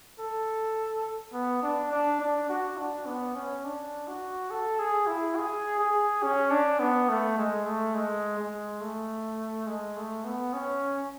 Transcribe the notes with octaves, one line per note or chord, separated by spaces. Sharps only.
A4
B3
D4
D4
D4
F#4
D4
B3
C#4
D4
F#4
A4
G#4
E4
G#4
G#4
C#4
D4
B3
A3
G#3
A3
G#3
G#3
A3
G#3
A3
B3
C#4